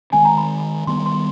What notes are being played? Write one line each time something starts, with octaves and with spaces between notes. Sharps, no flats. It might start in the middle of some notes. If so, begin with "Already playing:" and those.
D#3 G#3 C4 G#5
A#5
B5
D#3 G3 B3 C6
C6